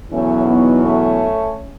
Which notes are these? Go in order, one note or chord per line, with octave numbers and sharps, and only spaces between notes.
E2 B2 F#3 A3 C#4
B3 D#4
A3 C#4